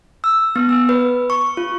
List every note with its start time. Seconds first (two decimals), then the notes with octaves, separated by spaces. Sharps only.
0.24 E6
0.56 B3
0.69 E6
0.89 B4
1.30 C#6
1.57 F4